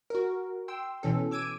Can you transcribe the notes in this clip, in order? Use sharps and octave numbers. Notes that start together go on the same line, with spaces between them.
F#4 A#4
G5 C6 E6
B2 E3 C#4 A4
D6 E6 G#6 D7 D#7